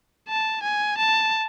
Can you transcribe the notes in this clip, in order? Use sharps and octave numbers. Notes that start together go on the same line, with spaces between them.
A5
G#5
A5